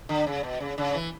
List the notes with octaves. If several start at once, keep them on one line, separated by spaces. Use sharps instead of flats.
D3
C#3
B2
C#3
C#3
E3